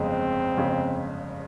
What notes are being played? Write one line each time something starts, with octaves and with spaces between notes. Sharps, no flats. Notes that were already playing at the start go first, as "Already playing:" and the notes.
Already playing: G1 F2 C#3 G#3 C4
G1 F2 C#3 G#3